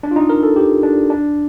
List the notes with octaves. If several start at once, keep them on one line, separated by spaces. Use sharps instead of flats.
D4
F4
D#4
A#4
A4
G4
D4
D4